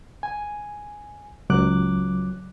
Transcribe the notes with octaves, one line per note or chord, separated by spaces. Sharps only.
G#5
C#2 F#3 D6 F#6